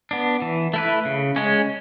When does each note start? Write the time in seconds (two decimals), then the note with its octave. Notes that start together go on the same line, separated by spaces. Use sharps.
0.11 B3 D4
0.42 E3
0.74 A3 E4 B4
1.05 C#3
1.36 G#3 C#4